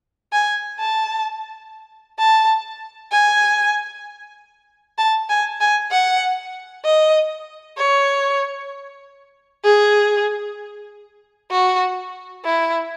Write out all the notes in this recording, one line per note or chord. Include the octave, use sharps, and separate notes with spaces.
G#5
A5
A5
G#5
A5
G#5
G#5
F#5
D#5
C#5
G#4
F#4
E4